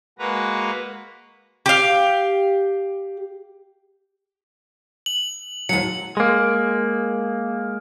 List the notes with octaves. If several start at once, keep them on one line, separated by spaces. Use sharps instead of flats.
G#3 A#3 F#4 B4 A#5
G4 F5
F#7
D#2 F#3 C#7
G#3 A#3